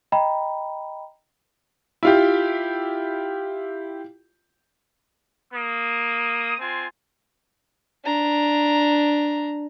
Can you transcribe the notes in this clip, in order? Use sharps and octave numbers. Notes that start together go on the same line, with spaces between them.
D#5 G5 A#5 B5
E4 F4 G4
A#3 D#6
C4 F4 G#5
D4 A#5